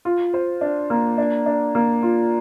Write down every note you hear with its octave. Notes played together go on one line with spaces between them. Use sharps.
F4
C5
D4
A#3
D4
D4
A#3
F4